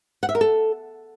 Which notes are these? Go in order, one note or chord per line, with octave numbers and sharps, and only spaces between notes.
F#5
E5
A#4
A4